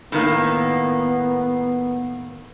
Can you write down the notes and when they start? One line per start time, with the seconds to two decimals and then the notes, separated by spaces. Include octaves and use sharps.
0.12 A2 D#3 A#3 B3